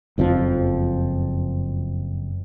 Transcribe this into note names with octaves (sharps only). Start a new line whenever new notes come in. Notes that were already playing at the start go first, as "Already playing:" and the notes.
F#1 F2 A#2 F3